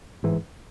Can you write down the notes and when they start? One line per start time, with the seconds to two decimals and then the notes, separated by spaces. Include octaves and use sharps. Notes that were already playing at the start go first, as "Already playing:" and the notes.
0.23 A1 G#2 E3